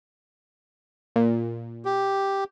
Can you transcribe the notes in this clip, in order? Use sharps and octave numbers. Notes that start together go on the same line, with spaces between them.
A#2
G4